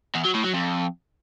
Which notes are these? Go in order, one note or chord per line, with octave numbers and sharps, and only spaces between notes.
E2
F#3
A2
F#3
F2